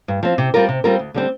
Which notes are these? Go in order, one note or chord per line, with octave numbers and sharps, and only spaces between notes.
G2
F3 C4
C3
G3 C4 F4 A#4
C3
G3 C4 F4 A#4
D2
D3 G3 C4